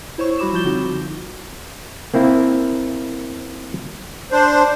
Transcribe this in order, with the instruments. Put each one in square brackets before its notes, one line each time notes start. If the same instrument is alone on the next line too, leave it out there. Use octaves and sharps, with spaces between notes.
[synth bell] E4 C5 C#5 C#6
G3 F#4 B5 D6 E7
F3 F4 G6 G7
D3 C4 D#4 F#4
[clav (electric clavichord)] A#3 C4 E4
[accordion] D4 C5